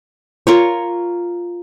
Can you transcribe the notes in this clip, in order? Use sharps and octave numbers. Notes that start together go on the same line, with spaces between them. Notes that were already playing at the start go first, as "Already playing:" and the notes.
F4 A#4 C#5